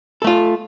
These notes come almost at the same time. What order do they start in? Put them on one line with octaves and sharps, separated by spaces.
A4 A3 F4